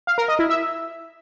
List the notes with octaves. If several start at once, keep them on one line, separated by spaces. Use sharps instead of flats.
F5
A#4
D#5
E4
E5